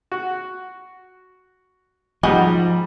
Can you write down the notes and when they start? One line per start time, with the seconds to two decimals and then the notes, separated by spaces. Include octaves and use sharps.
0.12 F#4
2.23 G#2 F3 G3 F#4 D#5 G#5